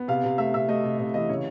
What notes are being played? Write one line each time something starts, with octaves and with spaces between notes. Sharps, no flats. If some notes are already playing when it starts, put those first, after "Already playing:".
Already playing: B3
C3 F5
C3
A3 E5
C3 E5
A3 D#5
C3
C3 D#5
E3 D#5
C#3 C#5